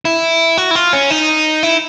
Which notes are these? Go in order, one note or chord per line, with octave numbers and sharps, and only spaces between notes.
E4
F#4
E4
F4
C#4
D#4
E4